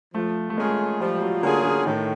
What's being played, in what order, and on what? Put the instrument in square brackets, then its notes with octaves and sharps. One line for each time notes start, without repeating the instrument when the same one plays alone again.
[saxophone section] F3 [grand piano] A3
[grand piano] A3
[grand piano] G#3 [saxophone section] A#3 C#4 F4 G#4
[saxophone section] F3 [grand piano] G3
[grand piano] G3
F#3
[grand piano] D3 [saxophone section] A#3 C#4 F4 G#4
[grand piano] D3
[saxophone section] A2 [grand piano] D#3